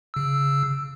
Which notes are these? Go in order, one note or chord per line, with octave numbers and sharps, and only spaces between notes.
C#3 E6